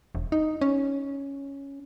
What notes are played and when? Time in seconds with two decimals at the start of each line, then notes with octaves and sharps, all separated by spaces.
0.15 E1
0.32 D#4
0.61 C#4